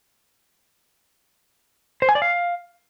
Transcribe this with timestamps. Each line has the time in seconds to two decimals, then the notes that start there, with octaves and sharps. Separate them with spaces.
2.02 C5
2.09 G#5
2.15 D5
2.22 F5